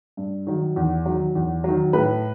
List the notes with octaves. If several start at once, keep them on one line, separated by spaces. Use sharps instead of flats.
G2
D#3 F#3
E2
D#3 F#3
E2
D#3 F#3
A2 B4